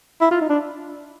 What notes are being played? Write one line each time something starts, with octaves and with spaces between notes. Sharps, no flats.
E4
F4
D#4
D4